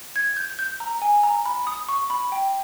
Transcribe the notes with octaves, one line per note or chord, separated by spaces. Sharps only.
G#6
G6
G6
A#5
G#5
A#5
B5
D#6
C#6
B5
G5